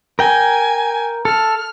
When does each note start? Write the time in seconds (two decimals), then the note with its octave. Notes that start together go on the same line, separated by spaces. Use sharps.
0.19 A#4 G5 G#5
1.25 A4 F6